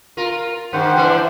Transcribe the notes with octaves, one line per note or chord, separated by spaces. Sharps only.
F4 A#4
G2 D#3 C5 F#5
E3 D4